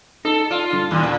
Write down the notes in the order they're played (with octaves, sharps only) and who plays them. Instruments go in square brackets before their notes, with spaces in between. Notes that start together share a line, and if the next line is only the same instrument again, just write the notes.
[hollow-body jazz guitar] D#4 [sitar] A4
[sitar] F4 [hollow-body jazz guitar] D5
[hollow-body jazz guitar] G2 D3
[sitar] D#2 A#2
[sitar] A#2 [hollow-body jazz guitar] D4